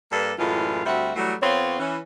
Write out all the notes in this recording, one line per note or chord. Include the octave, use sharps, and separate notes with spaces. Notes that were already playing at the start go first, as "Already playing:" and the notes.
G2 A#3 D4 A4 B4
F#2 A2 E3 G#3 F4
D2 G3 C4 F#4 E5 F#5
E3 F#3 G3 A3
F2 B3 C4 F4 C#5
E3 C#4